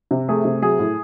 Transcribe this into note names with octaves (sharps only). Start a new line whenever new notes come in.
C3
A3 G#4
C3
F#3 G#4
A2